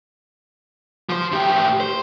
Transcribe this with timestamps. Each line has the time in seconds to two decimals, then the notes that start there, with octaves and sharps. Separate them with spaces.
1.09 F3 C5
1.32 A2 G4
1.80 C5